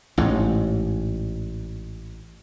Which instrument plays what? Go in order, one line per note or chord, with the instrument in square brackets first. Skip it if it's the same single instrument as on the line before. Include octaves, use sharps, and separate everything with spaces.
[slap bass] A1 G#2